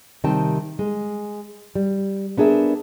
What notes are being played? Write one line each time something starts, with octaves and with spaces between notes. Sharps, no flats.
C3 D#3 G3 C4 G5 A5
G#3
G3
B3 D4 G#4 A#4 E5